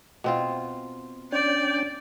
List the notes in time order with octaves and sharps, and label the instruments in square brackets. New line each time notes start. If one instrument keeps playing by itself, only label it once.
[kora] B2 C4 F4
[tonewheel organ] C#4 D4 G5 [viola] D5